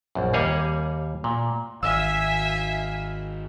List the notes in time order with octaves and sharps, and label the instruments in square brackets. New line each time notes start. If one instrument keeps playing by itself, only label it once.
[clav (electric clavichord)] A#1 F#2
D#2 G3 A#3 G#4 C#5 G#5
A#2
[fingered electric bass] G#1 [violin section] E5 G#5 [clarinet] F5 [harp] E6